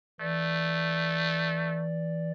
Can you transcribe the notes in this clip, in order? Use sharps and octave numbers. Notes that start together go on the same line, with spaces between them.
E3 A3 D5